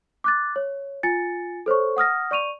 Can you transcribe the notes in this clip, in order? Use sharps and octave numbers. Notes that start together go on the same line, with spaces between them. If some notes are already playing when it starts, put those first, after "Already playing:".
D6 F#6 A6
C#5
F4 G#5 A6 C#7
A4 C5 C#5 C#6
F#5 D#6 F6 A#6
D5 C#6 D#7 F7